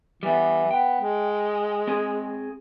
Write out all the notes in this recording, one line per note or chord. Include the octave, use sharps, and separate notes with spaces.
E3 G3 B3
B3 G5
G#3
C4 G#4